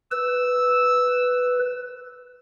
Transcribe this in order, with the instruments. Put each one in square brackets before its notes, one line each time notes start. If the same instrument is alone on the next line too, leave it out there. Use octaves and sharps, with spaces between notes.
[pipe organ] B4 [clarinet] E6